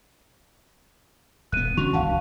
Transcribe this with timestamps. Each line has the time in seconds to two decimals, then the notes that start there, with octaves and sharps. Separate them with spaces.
1.52 D#1 B3 F#6 D#7
1.77 D3 C#4 D4 F#4 C#6 F7
1.93 D1 C2 D#3 F5 F#5 A5